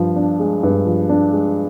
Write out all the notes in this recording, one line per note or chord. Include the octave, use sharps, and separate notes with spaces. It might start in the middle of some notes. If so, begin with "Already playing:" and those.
Already playing: G2 F3
D4
G#3
G2
F3
D4
G#3